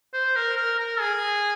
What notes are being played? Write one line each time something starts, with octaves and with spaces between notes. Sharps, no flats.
C5
A#4
A#4
A#4
G#4